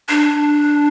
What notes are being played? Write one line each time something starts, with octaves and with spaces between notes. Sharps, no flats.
D4